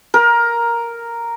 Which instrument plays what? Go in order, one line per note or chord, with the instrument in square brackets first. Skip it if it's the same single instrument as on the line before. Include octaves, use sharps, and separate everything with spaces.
[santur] A#4